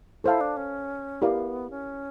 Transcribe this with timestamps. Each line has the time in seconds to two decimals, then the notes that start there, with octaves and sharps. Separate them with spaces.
0.24 E4 A4 C5 F5 A5
0.41 D4
0.57 C#4
1.21 B3 E4 G4 A#4 D5 F5
1.70 C#4